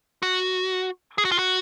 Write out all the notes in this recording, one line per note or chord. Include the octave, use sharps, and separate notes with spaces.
F#4
G#4
F#4
F4
F#4